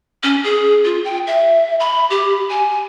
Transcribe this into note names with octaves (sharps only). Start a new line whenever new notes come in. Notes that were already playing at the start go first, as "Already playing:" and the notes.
C#4
G#4
F4
G5
E5
B5
G4
G#5